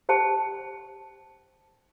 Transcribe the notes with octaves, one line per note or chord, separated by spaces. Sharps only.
G4 C5 G5 A5 C#6